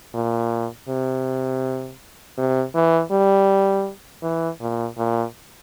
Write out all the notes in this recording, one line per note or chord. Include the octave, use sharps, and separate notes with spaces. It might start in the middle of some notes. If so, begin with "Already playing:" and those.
A#2
C3
C3
E3
G3
E3
A#2
A#2